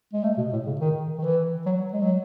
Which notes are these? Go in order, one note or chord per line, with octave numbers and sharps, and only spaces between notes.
G#3
A3
B2
A2
C#3
D#3
D#3
E3
F#3
G#3
F#3